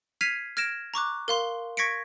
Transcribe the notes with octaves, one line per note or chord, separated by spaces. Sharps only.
F6 G#6 B6 C7 D#7 F7
F6 G#6 A#6 D7 E7
A#5 C#6 D6 F#6
A#4 F5 C6
C#6 G#6 A#6 B6 C#7 D7